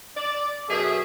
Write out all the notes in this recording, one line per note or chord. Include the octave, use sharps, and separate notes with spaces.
D5
F#2 B2 G#4 A4 E5